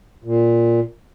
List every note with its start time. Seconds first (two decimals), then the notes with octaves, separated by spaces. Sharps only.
0.24 A#2